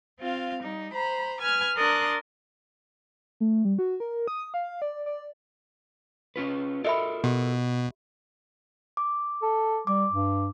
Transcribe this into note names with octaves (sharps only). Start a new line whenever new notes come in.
C4 F4 F5
G3 D#4
C5 A#5 B5
B4 G#5 F6 G#6
D4 A#4 C6 D#6 F#6 A6
A3
G3
F#4
A#4
D#6
F5
D5
D5
C#4 F4 B4
F4 A4 A#4 D#5 E5 B5
B2 G4
D6
A4
G3 D6
G2